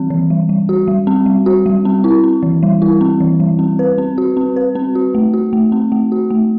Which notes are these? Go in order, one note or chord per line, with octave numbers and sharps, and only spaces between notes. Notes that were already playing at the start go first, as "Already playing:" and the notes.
Already playing: E3 G3 C4
E3
G3
G3
F#4
G3
C4
G3
F#4
G3
C4
E4
C4
E3
G3
E4
C4
E3
G3
C4
B4
C4
F#4
C4
B4
C4
F#4
A3
F#4
A3
C4
A3
F#4
A3